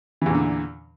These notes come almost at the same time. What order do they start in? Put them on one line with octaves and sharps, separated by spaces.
E3 E2 A#2 D3